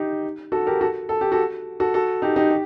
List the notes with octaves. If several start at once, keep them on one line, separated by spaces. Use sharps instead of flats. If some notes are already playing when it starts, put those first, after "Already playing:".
Already playing: D#4 G4
F#4 A4
G4 A#4
F#4 A4
A4
G4
F#4 A4
F#4 A4
F#4 A4
D#4 G4
D#4 G4
G4